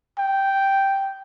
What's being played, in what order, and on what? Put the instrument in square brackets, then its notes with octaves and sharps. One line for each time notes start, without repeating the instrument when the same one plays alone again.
[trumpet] G5